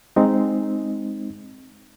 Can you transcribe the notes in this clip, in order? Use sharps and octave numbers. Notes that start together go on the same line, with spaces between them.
G#3 C4 D#4